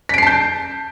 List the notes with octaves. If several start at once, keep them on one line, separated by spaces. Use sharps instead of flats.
A5 G6 B6 C7 D7